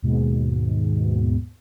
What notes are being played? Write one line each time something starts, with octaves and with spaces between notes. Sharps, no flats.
D#2 G#2 B2